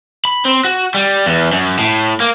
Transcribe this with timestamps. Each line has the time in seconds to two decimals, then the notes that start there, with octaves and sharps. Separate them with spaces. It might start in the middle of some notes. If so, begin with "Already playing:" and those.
0.25 B5
0.45 C4
0.65 F#4
0.94 G3
1.26 E2
1.53 F#2
1.79 A2
2.20 A#3